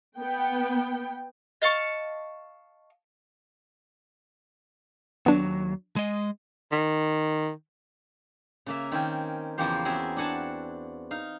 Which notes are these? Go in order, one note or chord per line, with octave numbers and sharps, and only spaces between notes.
B3 G5
D#5 F5 A5 C#6
D#2 F#3 B3 D4
G#3 D#5
D#3
C#3 A#3 E5
D#3 C4 C#4 G#5
E2 C#3 F3 A#3 G4 C5
C4 C#4 F#4 G#4 E5
D4 F#4 F#5 G#5 A5
D#4 F5